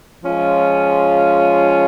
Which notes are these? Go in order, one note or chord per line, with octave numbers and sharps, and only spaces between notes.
F3 G#3 C#4 F4